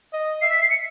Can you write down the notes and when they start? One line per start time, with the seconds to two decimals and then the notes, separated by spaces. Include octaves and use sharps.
0.13 D#5
0.42 E5 C7
0.51 B6
0.61 C7
0.70 C#7